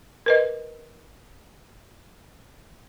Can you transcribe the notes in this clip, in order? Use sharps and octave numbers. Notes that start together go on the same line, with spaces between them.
A#4 B4 D#5